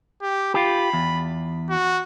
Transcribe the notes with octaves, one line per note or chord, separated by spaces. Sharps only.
G4
F4 G4 B5
E2
F#4